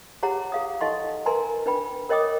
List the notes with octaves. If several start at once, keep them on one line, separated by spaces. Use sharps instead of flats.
G4 G#4 C#5 F#5 A#5
G#4 F5 D#6
D#4 A4 D#5 F#5 C6 C#6
A#4 B4 G#5 A#5 C6
D4 B4 G5 B5
A#4 C#5 D#5 G5 D6 D#6